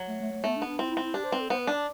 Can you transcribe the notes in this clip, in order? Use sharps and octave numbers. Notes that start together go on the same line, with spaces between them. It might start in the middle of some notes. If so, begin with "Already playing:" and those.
Already playing: F#3
A3
A3
A3
A3 B3
D4
B3
D4
C4 E4
E4
C4
E4
D4 G4
C5
C4 B4
A4
B3 C5
B4
D4 D5